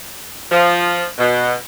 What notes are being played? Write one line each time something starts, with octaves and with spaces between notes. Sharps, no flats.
F3
B2